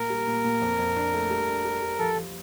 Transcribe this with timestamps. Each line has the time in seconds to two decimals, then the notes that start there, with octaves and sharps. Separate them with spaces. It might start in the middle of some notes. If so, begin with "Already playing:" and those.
Already playing: A#2 A#4
0.10 G3
0.27 A#2
0.44 A#2
0.61 F2
0.79 F2
0.96 D4
1.14 A3
1.30 G3
1.48 D4
1.65 G3
1.82 G3
1.99 F3 A4
2.16 F3